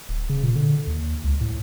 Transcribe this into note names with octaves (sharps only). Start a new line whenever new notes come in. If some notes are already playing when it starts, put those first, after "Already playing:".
D1
C#3
A#2
D3
D#2
C#2
A2